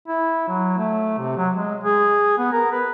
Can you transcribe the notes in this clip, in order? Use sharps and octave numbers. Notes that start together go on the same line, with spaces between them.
E4
F#3
A3
C3
F#3
G#3
G#4
B3
A#4
B4